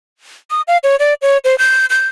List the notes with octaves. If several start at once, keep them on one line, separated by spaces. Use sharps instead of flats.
D#6
F5
C#5
D5
C#5
C5
G6
G6